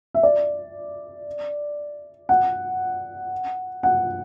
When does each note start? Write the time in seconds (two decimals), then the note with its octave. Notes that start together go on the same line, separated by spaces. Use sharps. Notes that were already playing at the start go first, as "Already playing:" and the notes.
0.14 E5
0.23 D5
2.29 F#5
3.83 F#5